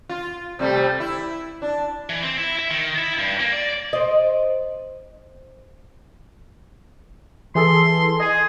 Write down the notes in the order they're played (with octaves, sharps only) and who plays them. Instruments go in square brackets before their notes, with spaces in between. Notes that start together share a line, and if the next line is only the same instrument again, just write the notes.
[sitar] F4
C3 G3 A3
E4
D4
[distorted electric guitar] E3
C4
E4
E5
D#3
E4
G2
A#3
D5
[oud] C5 D#5
[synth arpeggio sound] E3 G#4 A4 [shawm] C6
[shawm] G#4 [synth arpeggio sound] D#5 G#5